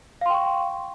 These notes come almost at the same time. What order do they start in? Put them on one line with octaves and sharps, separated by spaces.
F5 C6 G5 C#6